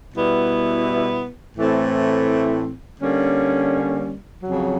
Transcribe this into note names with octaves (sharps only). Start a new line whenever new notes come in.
B2 G3 B3 E4
A2 E3 A3 C4
D3 G3 A#3 C#4
F2 C#3 F#3